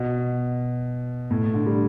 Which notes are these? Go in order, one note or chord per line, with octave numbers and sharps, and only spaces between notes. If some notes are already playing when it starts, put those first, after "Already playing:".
Already playing: B2
A2
D3
G3